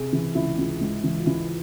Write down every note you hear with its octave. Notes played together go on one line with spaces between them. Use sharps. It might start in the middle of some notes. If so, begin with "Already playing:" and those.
Already playing: C3 G#4
E3
C#2 E4
C#2
G#2
E3
F4
E3 E4